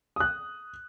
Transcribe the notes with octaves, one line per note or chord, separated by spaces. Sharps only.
D#6 F#6